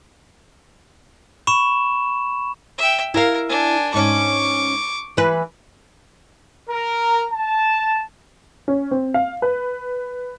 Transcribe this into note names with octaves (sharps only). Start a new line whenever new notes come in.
B5 C#6 E7
E5 G5
E4 A#4 F5
D4 G#5
G#2 C#4 C#6 D6
E3 B4
A#4
A5
C#4
C4
F5
B4